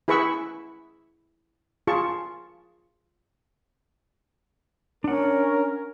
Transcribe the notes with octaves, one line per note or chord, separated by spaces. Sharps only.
E4 G#4 B4 B5 C#6 E6
F4 G#4 A5 C#6
C#4 D4 A#4 F#5